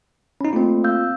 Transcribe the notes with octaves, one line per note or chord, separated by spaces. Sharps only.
C#4 D#4 B5
A3 A#3 C4 F4
F5 E6 G6